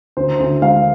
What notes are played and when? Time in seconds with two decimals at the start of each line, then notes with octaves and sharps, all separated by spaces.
0.17 D2 C5
0.40 D2
0.62 G#3 F5